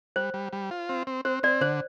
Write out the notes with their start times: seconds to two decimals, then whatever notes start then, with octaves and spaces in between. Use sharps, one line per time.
0.16 G3 C5
0.34 G3
0.53 G3
0.71 F4
0.89 C4
1.07 C4
1.25 C4 C5
1.43 C4 D5
1.61 D3 C5